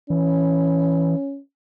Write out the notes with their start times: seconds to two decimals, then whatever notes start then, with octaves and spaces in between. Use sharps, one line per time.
0.10 E3 C#4